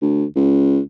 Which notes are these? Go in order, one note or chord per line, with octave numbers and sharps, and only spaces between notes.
D2
C#2